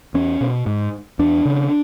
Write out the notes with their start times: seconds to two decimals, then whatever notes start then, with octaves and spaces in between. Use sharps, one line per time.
0.14 E2 C#4
0.41 B2
0.66 G#2
1.19 E2 D4
1.45 C#3